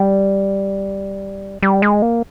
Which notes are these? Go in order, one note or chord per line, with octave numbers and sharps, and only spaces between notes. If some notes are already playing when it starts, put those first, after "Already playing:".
Already playing: G3
G3
G#3
A#3